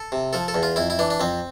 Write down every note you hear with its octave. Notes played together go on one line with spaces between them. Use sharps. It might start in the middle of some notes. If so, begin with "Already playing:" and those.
Already playing: A4
C3
F3 A4
A4
E2
F4
F2 E4
E4
E3 D4
D4
F2 C4